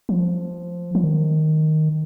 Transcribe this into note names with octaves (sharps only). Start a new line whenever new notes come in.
F3
F3
D#3